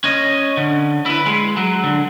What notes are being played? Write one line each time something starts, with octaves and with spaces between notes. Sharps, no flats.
C#4 D#5
D3
E4 B4
G#3
F#3
D3